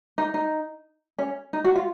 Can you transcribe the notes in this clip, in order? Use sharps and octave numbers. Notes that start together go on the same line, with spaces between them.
D#4
D#4
C#4
D#4
F#4
F4